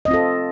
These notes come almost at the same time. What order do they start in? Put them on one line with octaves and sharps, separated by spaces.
D#5 C4 F4 A4